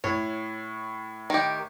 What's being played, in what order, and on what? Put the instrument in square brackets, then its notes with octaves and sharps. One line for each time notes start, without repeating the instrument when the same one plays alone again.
[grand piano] A2 [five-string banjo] C#5
[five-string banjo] D#3 G4